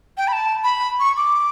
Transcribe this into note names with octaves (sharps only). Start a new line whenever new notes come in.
G5
B5
A5
B5
C#6
D6